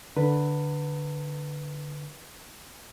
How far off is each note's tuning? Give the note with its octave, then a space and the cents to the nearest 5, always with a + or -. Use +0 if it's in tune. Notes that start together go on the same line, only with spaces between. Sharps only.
D3 +0 B4 +0 A5 +35